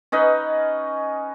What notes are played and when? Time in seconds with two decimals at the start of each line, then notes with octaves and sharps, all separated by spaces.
0.12 C#4 D#4 B4 D#5